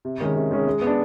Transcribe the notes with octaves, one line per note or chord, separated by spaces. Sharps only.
C3
D#3 G#3 C#4
C3
D#3 G#3 C#4
G#3
B3
D4